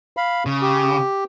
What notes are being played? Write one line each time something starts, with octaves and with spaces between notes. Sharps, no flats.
F5 B5
C#3
G4